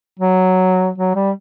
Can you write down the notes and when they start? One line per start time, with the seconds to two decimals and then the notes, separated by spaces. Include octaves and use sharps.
0.19 F#3
0.98 F#3
1.15 G3